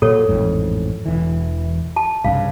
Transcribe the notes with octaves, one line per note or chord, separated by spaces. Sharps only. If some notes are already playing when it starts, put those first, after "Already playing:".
A#2 F#3 A4 C#5
A1 F2 G#2
E1 E3
A5
C2 G2 C#3 F5